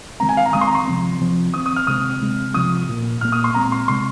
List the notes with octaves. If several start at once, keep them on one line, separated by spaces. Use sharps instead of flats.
D#3 G#3 C4 A#5
G#5
F5
A#5
D#3 G#3 C4 D#6
C6
A#5
C6
C3 F3 C4
C3 F3 C4
D#3 C4 D#6
D#6
F6
C3 G#3 C4 D#6
C3 G#3 C4
C3 F3 C4 D#6
A#2 A#3
A#2 A#3 F6
D#6
C6
A#2 G#3 C4 A#5
C6
C3 G#3 C4 C6